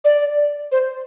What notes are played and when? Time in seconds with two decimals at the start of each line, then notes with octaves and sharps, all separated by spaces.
0.05 D5
0.72 C5